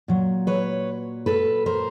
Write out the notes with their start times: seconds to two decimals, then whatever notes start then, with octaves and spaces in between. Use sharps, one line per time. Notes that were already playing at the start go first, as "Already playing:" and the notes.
0.08 A#2 F#3
0.47 B4 C#5
1.26 A4 B4
1.66 A#4 C5